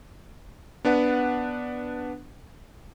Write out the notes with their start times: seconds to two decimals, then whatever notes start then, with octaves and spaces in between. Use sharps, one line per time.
0.85 B3 D4 B4 F#5